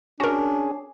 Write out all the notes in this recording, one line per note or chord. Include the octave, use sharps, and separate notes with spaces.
C#4 D4 F#4 G#4 A#4